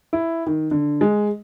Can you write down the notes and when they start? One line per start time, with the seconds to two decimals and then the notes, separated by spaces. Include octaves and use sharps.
0.13 E4
0.47 D#3
0.71 D3
1.01 G#3